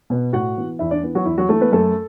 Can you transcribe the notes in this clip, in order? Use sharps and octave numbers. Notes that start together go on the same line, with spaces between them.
B2 B3
A2 F#4 F#5
E3 B3
E2 E4 E5
D4 D5
E3 B3
F#3 F#4
E2 E4
F#3 F#4
E3 A3 A4
B3 B4
F#2 A3 A4